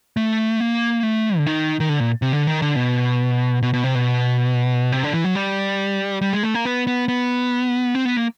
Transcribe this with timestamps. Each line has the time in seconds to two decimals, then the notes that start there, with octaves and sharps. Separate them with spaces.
0.17 A3
0.60 A#3
1.03 A3
1.37 D3
1.46 D#3
1.80 D#3
1.89 D3
2.00 A#2
2.22 C3
2.33 D3
2.47 D#3
2.62 D3
2.76 B2
3.63 B2
3.73 B2
3.84 C3
3.95 B2
4.92 C3
5.03 D3
5.13 E3
5.24 F#3
5.35 G3
6.22 G3
6.33 G#3
6.43 A3
6.54 A#3
6.65 B3
6.87 B3
7.08 B3
7.95 C4
8.05 B3
8.17 A#3